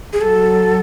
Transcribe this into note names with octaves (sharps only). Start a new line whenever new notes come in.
G#4
F#3 A4